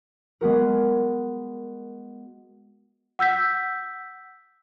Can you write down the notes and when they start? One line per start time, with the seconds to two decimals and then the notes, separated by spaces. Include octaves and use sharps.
0.41 G#3 B3 F#4 A#4
3.19 F#5 E6 G6 B6